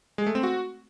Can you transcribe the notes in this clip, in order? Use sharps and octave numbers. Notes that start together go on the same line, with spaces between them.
G#3
A3
C4
F#4